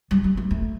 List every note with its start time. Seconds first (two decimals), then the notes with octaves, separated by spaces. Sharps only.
0.11 G3
0.24 G3
0.37 A3
0.51 A3